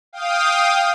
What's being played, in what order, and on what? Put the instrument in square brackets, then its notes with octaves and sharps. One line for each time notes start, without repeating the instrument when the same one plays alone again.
[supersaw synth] F5 G5 D#6